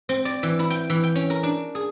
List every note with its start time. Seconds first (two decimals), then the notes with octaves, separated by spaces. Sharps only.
0.09 C4
0.25 D5
0.43 E3
0.59 E4
0.70 G5
0.90 E3
1.04 G5
1.15 C#4
1.30 A#4
1.43 D4
1.75 G#4